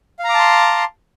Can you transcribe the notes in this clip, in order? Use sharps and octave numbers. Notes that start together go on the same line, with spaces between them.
F5 A5 A#5 C6 D6